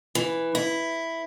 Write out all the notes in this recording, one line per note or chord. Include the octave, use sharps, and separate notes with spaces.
E3
E4